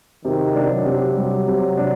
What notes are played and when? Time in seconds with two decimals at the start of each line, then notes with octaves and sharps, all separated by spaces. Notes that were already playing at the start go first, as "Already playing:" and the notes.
0.25 C3 D#3
0.55 D4
0.71 F#3
0.86 C3
1.16 G3
1.48 C3
1.77 D4